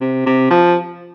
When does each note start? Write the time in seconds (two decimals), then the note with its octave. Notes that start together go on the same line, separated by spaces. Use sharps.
0.01 C3
0.26 C3
0.50 F3